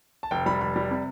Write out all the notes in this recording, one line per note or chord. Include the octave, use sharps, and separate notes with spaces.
A5
F1 G5
G3 B5
F1 B5
G3
C3